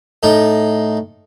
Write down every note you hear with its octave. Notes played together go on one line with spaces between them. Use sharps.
A2 D#4